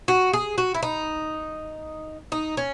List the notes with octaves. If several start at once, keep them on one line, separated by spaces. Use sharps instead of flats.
F#4
G#4
F#4
E4
D#4
D#4
C#4